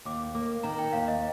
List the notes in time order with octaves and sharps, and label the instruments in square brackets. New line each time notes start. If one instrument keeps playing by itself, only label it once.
[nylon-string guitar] D#2 [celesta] D6
[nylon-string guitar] A#3 [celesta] D6
[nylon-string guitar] D#3 [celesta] A#5
[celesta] G5
[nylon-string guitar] D#2 [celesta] F5
[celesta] D#5